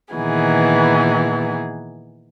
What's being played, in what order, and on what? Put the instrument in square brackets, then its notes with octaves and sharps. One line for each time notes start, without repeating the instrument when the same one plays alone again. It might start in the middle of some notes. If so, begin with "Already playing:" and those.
[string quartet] A#2 D#3 E3 B3 G#4